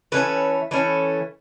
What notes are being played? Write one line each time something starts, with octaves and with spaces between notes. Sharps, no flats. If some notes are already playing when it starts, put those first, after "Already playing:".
E3 A3 C#4 B4
E3 A3 C#4